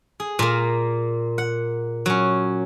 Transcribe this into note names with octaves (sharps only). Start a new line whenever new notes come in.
G#4
A#2 A#3
F#5
F#3 C#4